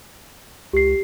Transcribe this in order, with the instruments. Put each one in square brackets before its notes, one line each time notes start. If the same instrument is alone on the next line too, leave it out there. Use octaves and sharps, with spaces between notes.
[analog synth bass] C#2 [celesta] G4 C7